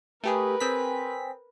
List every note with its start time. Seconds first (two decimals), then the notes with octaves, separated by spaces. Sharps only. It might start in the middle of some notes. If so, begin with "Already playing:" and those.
0.24 A3 G4 G#4 A#4 B4
0.60 C4 G#4 B6